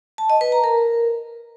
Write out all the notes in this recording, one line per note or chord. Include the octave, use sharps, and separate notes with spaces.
A5
D#5
B4
A#5
A#4